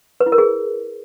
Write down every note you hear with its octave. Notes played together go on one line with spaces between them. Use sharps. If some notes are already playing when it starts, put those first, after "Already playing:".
B4
E4
A#4
G#4